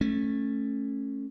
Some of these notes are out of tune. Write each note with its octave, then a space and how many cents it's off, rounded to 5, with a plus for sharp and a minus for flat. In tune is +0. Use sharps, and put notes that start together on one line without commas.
A3 +0 C#4 -15